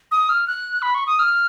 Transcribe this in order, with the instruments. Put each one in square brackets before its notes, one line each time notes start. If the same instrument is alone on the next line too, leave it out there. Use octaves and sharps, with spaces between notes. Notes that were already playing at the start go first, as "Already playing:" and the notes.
[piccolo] D#6
F6
F#6
B5
C#6
D#6
F6